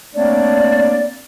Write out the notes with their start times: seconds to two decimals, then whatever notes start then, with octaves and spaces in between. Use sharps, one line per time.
0.14 A3 A#3 C4 D4 C#5 D5